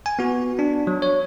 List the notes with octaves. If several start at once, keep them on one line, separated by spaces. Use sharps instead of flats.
G#5
B3 F#4
D4
F#3
C#5